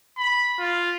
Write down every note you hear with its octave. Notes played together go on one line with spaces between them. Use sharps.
B5
F4